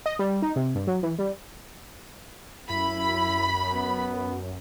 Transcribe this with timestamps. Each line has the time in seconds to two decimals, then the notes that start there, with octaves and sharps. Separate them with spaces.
0.06 D#5
0.19 G3
0.42 D#4
0.56 C3
0.75 G2
0.87 F#3
1.03 E3
1.19 G3
2.70 F#2 E4 B5
3.73 B3